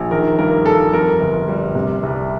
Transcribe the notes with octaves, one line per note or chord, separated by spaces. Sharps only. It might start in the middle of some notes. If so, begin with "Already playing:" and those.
Already playing: A#1
D#3 A#4
G2 A#4
G2 A4
F2 A#4
G1
G3
C3
C2